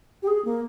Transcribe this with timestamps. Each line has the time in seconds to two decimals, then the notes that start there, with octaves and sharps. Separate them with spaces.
0.23 G4
0.28 G#4
0.45 A#3